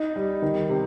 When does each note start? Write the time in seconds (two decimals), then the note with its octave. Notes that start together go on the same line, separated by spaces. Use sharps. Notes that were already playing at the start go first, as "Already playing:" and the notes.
Already playing: D#4
0.16 G3
0.42 D#3
0.69 C3